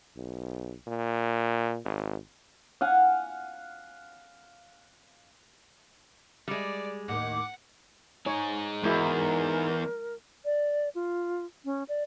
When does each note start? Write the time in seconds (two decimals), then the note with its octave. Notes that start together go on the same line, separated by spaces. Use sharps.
0.17 B1
0.87 A#2
1.85 G#1
2.81 F5 F#5 G#5
6.48 G3 G#3 D5
7.08 D#2 A2 D#3 F#5 D6
8.26 D#4 G#4 C#5
8.83 E2 G#3 E4 F#4 A#4
10.45 D5
10.95 F4
11.65 C#4
11.88 D5